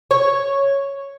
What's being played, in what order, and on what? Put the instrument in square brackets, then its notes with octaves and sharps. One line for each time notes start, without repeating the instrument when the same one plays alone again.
[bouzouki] C#5